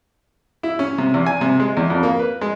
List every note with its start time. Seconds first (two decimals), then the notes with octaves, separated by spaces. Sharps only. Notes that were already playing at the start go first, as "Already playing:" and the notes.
0.63 E4
0.79 C#4
0.98 C3
1.14 E2
1.26 G#5
1.41 C3
1.60 G#3
1.77 E2
1.90 F2
2.03 A#3
2.19 B4
2.41 G#3